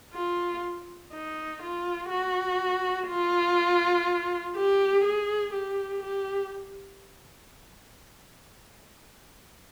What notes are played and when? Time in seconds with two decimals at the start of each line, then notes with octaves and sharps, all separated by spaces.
0.14 F4
1.13 D#4
1.62 F4
2.11 F#4
3.08 F4
4.56 G4
5.04 G#4
5.54 G4
6.03 G4